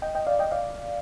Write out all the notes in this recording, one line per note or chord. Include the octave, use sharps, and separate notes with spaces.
D#5 G5
D#5 G5
D5 F5
D#5 G5
D5 F5